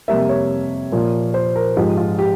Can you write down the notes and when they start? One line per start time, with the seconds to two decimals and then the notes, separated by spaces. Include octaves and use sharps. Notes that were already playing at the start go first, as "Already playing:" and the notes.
0.08 F2 C3 G3 A#3 E5
0.29 C#5
0.92 A#2 F3 A#3
1.34 C5
1.56 A#4
1.76 G#2 F3 G#3 G4
1.97 F4
2.19 G4